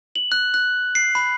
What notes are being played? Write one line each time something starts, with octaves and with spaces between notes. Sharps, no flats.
F#7
F#6
F#6
C7
B5